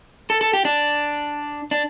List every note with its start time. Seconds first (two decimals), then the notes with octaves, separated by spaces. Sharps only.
0.30 A4
0.41 A4
0.53 G4
0.65 D4
1.71 D4